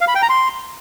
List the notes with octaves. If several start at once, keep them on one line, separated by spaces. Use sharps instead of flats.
F5
B5
G5
A#5
C6